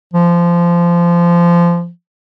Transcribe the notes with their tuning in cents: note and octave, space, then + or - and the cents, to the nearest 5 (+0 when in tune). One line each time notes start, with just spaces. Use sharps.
F3 -20